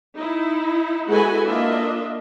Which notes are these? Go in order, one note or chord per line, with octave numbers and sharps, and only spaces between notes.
D#4 E4
G#3 E4 F#4 A4 B4 G#5
A#3 D4 F4 D#5 E5